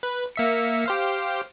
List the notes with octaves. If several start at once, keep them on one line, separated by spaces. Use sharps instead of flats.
B4
A#3 E5 C#7
G4 C5 F5